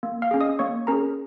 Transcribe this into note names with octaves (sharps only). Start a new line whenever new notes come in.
A#3
F5 F6
C#4 G#4
D#5 D#6
A#3 C#5 C#6
C#4 G#4 A#4 A#5